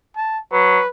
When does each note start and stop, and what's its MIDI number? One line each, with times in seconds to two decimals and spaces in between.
0.16 0.39 81
0.53 0.78 54
0.53 0.88 71